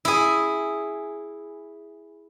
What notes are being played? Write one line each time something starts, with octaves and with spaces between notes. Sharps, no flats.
E4 G#4